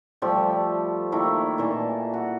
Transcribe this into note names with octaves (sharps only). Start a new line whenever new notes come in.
F3 G3 A3 G4
D#3 A3 A#3 E4
A#2 E3 A5
F#4